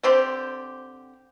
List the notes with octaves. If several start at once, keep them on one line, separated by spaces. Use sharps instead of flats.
D3 C4 G4